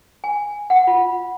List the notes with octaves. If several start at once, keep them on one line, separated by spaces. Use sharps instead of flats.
G#5
F#5
F4